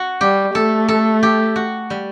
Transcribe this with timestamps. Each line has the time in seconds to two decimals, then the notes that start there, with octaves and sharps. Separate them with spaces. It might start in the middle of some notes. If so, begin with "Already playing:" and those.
Already playing: F#4
0.21 G3 G4
0.55 A3 A4
0.88 A4
1.23 G4
1.56 F#4
1.90 G3